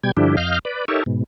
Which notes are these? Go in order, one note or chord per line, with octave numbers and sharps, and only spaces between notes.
B2 G3 G5 G#6
G2 D3 F3 D4 E4 G4
F2 D#5 F5 F6 G6
B4 D5
D#4 G4 A4 A#4 C#5 E5
G#2 B2